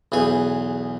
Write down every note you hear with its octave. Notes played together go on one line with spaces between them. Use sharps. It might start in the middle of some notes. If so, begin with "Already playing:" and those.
B1 E2 G#4